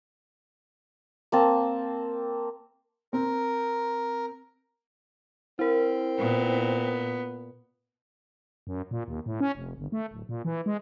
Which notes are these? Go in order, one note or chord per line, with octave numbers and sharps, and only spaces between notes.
A#3 C4 A5
C4 A#4
C4 E4 A#4
A#2 B3
F#2
A#2
D#2
A2
C#4
F1
G1
A3
D1
A#2
E3
G#3